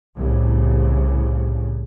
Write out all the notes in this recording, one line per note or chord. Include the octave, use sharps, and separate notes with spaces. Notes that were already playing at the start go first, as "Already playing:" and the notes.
C2 A2 C#3